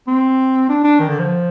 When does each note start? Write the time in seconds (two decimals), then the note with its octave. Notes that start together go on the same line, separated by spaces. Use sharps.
0.07 C4
0.69 D4
0.84 D4
1.00 D#3
1.09 D3
1.19 F3